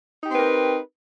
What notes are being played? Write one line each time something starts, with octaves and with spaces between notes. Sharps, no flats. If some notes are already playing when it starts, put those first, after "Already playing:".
C4 D#4 G4 A#4 B4